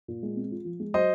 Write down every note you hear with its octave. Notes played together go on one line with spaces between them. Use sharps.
A#2
G#3
C4
F4
F3
G#3
F#3 C5 D#5